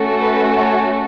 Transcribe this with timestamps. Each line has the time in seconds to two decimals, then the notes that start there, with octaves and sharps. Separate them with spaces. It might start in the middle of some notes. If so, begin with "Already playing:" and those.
Already playing: A3 C#4 F#4 A4
0.21 B4
0.57 C#5